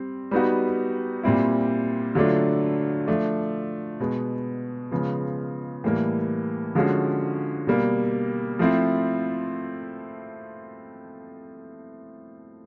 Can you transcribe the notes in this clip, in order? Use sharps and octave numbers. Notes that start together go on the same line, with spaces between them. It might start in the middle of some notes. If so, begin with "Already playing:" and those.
Already playing: G3 C4
G3 B3 D#4 F#4
A#2 G3 C4 E4
D3 F#3 A3 D4 F4
F3 A3 D4
B2 G#3 B3
C#3 F3 G#3 B3
A2 E3 G3 A#3
D3 F3 G#3 C#4 F#4
B2 G3 A#3
F3 A3 C4 E4